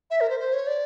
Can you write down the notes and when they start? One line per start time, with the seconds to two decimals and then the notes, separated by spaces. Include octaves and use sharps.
0.11 E5
0.21 A#4
0.30 C5
0.40 C5
0.53 C#5
0.67 D5